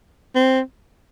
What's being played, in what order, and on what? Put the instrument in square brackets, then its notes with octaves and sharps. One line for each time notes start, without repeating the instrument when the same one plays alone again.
[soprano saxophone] C4